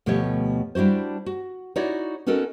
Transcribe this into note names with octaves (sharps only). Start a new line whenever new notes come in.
D2 B2 F3 A3 G4 C#5
G3 D4 E4 F#4 C5
F#4
D#4 E4 F#4 C#5 D5
B3 C#4 D#4 F#4 A4 A#4